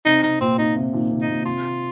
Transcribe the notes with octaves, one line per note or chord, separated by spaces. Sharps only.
C3 D#4
C3 D#4
A#2 C4
A#2 D#4
C3
A#2 D#3
C3
D#4
A#2
C3 F4